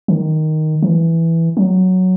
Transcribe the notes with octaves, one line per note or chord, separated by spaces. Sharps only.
D#3
E3
F#3